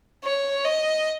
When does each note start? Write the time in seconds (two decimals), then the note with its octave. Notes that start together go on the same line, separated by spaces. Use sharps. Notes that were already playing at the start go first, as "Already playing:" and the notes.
0.24 C#5
0.65 D#5